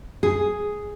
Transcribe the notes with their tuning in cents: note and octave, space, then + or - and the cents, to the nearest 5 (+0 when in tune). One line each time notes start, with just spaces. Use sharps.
G#4 +0